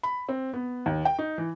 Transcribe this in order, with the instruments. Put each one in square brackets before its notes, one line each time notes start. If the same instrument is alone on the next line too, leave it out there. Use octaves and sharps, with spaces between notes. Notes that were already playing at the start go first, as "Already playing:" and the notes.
[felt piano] B5
C4
B3
D#2
G5
D#4
E3